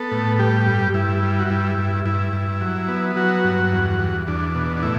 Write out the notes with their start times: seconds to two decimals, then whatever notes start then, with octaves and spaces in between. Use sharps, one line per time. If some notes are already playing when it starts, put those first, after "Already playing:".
Already playing: B3 A4
0.12 A2
0.39 G3 G4
0.66 G2
0.94 G2 E4
1.22 G3
1.39 F#4
1.50 G2 E4
1.78 G2
2.06 G2 E4
2.33 G2
2.61 F#3
2.88 B3
3.16 F#3 F#4
3.44 G2
3.72 E2
4.00 E2
4.27 E2 D4
4.55 B2
4.77 D4
4.82 A2 E4